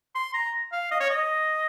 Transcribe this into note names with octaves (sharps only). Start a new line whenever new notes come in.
C6
A#5
F5
D#5
C#5
D#5